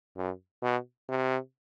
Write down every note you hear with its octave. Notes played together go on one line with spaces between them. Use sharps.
F#2
B2
C3